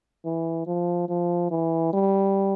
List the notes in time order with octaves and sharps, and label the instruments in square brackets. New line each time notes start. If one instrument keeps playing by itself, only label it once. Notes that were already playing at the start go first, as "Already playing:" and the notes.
[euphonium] E3
F3
F3
E3
G3